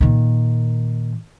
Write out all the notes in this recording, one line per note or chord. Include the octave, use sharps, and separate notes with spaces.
A#2 D#3